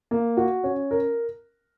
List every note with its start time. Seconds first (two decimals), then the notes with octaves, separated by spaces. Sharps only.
0.11 A#3
0.37 F#4
0.64 C#4
0.91 A#4